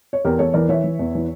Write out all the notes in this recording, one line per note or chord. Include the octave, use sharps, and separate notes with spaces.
C#5
E2 G4 A#4
E2 A4 C#5
E3 A#4 D5
E3 C#5 E5
E3
E2
E3